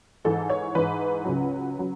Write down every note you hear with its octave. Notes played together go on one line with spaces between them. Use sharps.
G#2 E3 A4
C#5
G#2 E3 B4
C#2 C#3 F#3
C#3 F#3